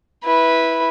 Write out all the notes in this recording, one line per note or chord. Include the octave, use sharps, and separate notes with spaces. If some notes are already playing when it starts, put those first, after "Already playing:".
E4 B4